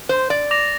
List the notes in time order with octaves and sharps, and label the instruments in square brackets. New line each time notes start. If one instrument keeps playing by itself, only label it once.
[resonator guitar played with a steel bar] C5
D5
[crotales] D6 A#6 F7